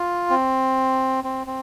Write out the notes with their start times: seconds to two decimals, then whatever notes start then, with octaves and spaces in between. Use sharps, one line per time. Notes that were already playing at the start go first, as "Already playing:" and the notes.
Already playing: F4
0.30 C4
1.24 C4
1.47 C4